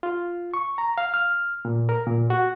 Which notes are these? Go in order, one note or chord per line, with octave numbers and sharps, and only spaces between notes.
F4
C#6
A#5
F5
F6
A#2
A#4
A#2
F#4